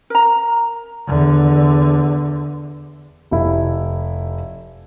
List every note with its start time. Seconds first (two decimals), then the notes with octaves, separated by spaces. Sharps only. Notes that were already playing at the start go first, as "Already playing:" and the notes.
0.10 A#4 A#5
1.07 E2 D3
3.31 F1 E4